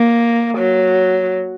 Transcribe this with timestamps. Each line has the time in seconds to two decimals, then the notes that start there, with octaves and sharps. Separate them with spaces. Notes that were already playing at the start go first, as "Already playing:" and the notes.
Already playing: A#3
0.58 F#3